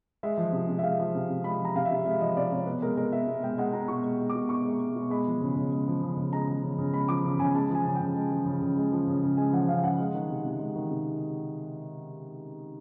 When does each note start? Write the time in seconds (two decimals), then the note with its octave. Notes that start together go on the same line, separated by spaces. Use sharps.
0.23 G#3 E5
0.37 F3
0.53 C3
0.69 C3
0.79 E5
0.83 G#3 F5
0.99 F3
1.15 C3
1.30 C3
1.44 G#3 B5
1.60 F3 A#5
1.76 C3 F5
1.85 E5
1.91 C3
2.05 G#3 E5
2.20 F3 D#5
2.37 C3 D5
2.51 C3 C#5
2.66 B2 B4
2.82 G#3 A#4
2.97 G#3 A#4
3.12 B2 E5
3.27 B2
3.43 G#3 G5
3.58 G#3 F#5
3.73 B2 A#5
3.88 B2 C#6
4.04 G#3
4.20 G#3
4.30 D6
4.35 B2
4.49 B2 C#6
4.65 G#3
4.80 G#3
4.95 B2
5.10 G#3 B5
5.27 F3
5.42 C#3
5.56 C#3
5.72 G#3
5.88 F3
6.03 C#3
6.17 C#3
6.32 G#3 A#5
6.48 F3
6.63 C#3
6.78 C#3
6.93 G#3 B5
7.08 F3 D6
7.25 C#3
7.39 C#3 G#5
7.55 G#3 A5
7.70 F3 G#5
7.85 C#3 G#5
7.96 C#3 G5
8.16 G#3
8.31 F3
8.46 C#3
8.62 C#3
8.77 G#3
8.92 F3
9.07 C#3
9.23 C#3
9.37 G#3 G#5
9.53 F3 F#5
9.69 C#3 F5
9.83 C#3 F#5
9.98 G#3
10.14 D#3
10.30 C3
10.45 C3
10.59 G#3
10.75 D#3
10.91 C3